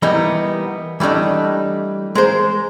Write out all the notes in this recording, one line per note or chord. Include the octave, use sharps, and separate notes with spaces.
E3 G3 A#3 B3 D#4
E3 G3 A3 D4 D#4
G#3 A#4 C5